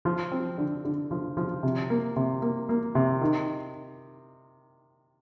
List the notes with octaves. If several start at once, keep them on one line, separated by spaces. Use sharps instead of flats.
F3
C4
D3
D3
F3
F3
C3
A#3
C3
A#3
A#3
C3
D#3